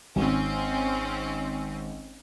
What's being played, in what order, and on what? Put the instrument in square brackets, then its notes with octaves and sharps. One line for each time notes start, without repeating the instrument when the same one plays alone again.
[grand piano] G#1 [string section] C4 C#4